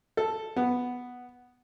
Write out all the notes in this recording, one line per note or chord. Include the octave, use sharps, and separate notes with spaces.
A4
B3